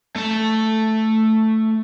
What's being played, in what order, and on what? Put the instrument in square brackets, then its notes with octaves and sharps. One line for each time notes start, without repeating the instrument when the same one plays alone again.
[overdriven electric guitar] A3 A5